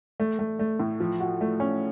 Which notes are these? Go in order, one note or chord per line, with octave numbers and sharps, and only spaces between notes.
A3
A3
A3
A2
F3
F#4
A3
C#4